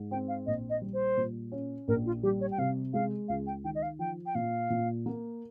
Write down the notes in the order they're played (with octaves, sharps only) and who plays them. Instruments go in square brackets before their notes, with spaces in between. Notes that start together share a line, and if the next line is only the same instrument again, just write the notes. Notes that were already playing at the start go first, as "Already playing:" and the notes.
Already playing: [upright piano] G#2
[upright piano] C4 [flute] G5
[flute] F5
[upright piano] A#1 [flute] D#5
[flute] D#5
[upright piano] G3
[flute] C5
[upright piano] A#2
C#4
[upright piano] A#1 [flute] A#4
[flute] F4
[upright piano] G3 [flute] G4
[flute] C#5
G5
[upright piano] C3 [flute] F5
[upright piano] G#3 [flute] F5
[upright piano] C#2 [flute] F5
[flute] G5
[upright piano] D#3 [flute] G5
[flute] D#5
F5
[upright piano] F3 [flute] G5
[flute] G5
[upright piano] A#2 [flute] F5
[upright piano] A#2
A#3